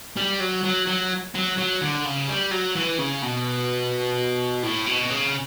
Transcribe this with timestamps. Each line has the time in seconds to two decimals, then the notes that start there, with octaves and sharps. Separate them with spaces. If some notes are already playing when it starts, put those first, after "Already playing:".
0.17 G3
0.40 F#3
0.63 F#3
0.87 F#3
1.35 F#3
1.58 F#3
1.81 D3
2.05 C#3
2.28 G3
2.51 F#3
2.75 E3
2.99 C#3
3.22 B2
4.63 A2
4.86 B2
5.10 C#3